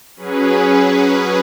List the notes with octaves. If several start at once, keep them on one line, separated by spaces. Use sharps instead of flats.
F#3 C#4 G#4 B4